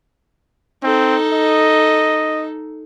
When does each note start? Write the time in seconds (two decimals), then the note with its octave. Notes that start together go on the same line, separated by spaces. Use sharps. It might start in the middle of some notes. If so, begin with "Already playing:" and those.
0.83 C4 D#4 A4
1.33 D#5